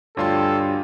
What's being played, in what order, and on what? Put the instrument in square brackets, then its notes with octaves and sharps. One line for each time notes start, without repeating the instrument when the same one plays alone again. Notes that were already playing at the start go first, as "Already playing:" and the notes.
[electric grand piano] D2 F4 C6 [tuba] G2 [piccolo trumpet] A4 [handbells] C#5 D5 G5